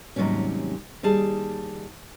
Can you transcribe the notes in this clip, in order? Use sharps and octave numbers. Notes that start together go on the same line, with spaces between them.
D#2 G#2 C3 F#3 G3 C#4
D#2 G3 G#4 A5